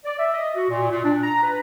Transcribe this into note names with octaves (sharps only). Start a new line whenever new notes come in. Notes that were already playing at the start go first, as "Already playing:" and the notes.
D5
E5
D#5
F#4
A#2
A#2
D4
A#5
B4